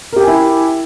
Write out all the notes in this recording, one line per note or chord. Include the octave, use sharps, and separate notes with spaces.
E4 G4 A#4 G5 G#5